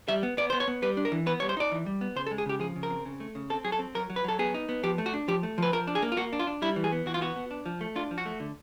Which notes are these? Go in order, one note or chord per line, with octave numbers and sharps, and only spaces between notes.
G3 E5
B3
B3 D5
B3 C5
C#5
B3
G3 B4
D4
A#4
E3
B3 B4
G3 C#5
C5
D#4 D5
E3
G3
B3
C#3 C5
A4
G#3
G#4
C#3 G4
F3 G#4
C#3
A#4
C4
C#3
A3
C#3
C4 A4
F#3 G#4
A4
C4
F#3 A#4
F#3
B4
F#3 A4
B3 G#4
D#4
B3
F3 G4
A3
F#4
D4
F3 G4
A3
F3 B4
F3 A#4
D4
G#4
A#3
F4
A#3 F#4
D4
F4
D4
G3 E4
E3
G#4
B3
E3 F#4
F4
B3 F#4
B3
D4
F3
A3
D4 F4
F3
F#4
A3
D3